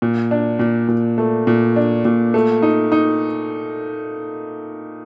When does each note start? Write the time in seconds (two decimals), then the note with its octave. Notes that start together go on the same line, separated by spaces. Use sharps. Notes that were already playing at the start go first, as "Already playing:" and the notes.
0.02 A#2
0.31 D4
0.59 A#2
0.88 A#2
1.18 A3
1.47 A#2
1.76 D4
2.05 A#2
2.34 A3
2.62 D#4
2.92 D#4